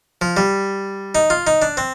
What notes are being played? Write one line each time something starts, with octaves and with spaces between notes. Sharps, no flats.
F3
G3
D#4
F4
D#4
D4
C4